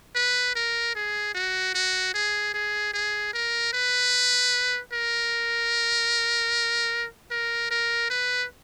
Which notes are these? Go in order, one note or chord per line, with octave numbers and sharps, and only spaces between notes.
B4
A#4
G#4
F#4
F#4
G#4
G#4
G#4
A#4
B4
A#4
A#4
A#4
B4